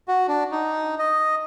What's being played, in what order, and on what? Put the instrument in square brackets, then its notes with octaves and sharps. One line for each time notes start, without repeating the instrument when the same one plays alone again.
[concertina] F#4
D4
D#4
D#5